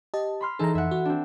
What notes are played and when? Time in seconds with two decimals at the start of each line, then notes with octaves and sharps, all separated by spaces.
0.14 G4 D#5 A5
0.41 B5 C6 F6
0.59 E3 D#4 G#4 A4 A#5
0.75 F2 E5 F#5
0.91 F#4
1.05 C4 D4